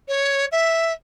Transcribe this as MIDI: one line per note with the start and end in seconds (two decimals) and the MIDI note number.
0.08 0.45 73
0.51 0.92 76